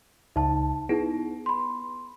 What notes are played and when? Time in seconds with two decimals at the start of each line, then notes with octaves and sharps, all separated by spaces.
0.36 C#2 D#4 A5
0.89 B3 D#4 E4 G#4
1.46 B5 C6